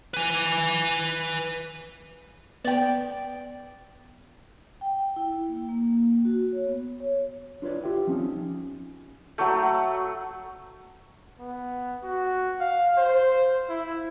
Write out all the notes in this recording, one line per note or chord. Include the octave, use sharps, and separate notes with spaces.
B4 G#5
B3 D5 G5
G5
E4
A#3
A#3
F#4
C#5
B3
C#5
D4 F4 B4 C#5 D5
F4 G4 E5 G5
F3 C4 C#4 D#4
F#3 A3
B3
F#4
F5
C5
E4